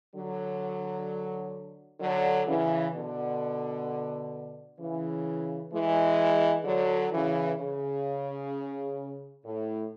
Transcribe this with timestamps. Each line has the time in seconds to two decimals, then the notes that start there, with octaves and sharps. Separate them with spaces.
0.15 D3 F#3
2.00 D3 F#3
2.47 C#3 E3
2.94 B2 D3
4.79 C#3 E3
5.72 E3 G#3
6.65 D3 F#3
7.11 C#3 E3
7.58 C#3
9.45 A2